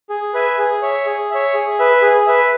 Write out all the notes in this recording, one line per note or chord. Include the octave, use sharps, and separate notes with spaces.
G#4
B4 E5 G#5
G#4
C#5 E5
G#4
C#5 E5
G#4
B4 E5
G#4
B4 E5